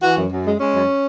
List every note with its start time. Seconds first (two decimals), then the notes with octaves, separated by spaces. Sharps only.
0.02 E3 F#4
0.15 F#2
0.30 F#2
0.45 G#3
0.59 G#3 C#4
0.74 F#2